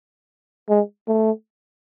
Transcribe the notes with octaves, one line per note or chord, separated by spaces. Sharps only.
G#3
A3